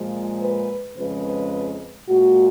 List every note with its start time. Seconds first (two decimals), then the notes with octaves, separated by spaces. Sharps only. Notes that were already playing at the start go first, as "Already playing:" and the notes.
Already playing: A#2 F3 G#3
0.41 B4
0.96 F2 C#3 F3 G#3 B4
2.08 A#2 G#3 F#4